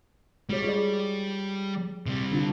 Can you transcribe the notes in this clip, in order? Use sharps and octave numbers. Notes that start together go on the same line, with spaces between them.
G3 G#3 F#4 C#5
F4 G#4 D5
C3 G3
D3 D4 F4